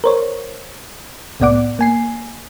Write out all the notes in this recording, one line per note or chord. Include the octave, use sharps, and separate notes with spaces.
A#4 C5 C#5
C2 A2 B3 D5 F#5 D6
A#3 G#5 C7